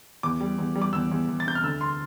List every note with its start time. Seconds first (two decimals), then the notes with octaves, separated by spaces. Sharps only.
0.23 E2 D6
0.41 G3
0.58 E2
0.76 G3
0.82 D6
0.93 E2 E6
1.11 E2
1.29 E2
1.40 A6
1.46 C3 G6
1.55 F6
1.63 D2 E6
1.81 C6